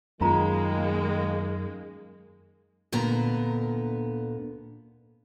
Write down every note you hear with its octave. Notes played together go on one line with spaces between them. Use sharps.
F#2 D#3 G#3 A#3 F4 A#5
D2 A#2 D3 B3 A#5